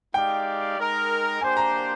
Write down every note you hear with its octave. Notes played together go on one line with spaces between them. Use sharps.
G#3 D#4 G4 D5 F5 G5
G#3 D#4 A#4
A#3 D4 G4 C5 G#5
A#5